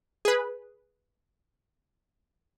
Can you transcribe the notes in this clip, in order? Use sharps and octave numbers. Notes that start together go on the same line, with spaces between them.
G#4 B4